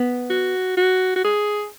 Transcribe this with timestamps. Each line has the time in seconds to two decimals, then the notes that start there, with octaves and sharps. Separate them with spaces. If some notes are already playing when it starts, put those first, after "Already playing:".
Already playing: B3
0.30 F#4
0.77 F#4
1.16 F#4
1.24 G#4